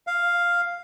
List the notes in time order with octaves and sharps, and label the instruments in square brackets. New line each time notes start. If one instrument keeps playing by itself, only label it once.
[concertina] F5